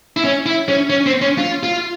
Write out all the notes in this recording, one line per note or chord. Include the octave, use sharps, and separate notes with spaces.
E4
C#4
E4
C#4
C#4
C4
C#4
F4
F4